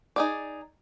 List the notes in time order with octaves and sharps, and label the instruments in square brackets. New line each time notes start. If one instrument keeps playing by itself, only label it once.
[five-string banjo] D#4 G#4 D5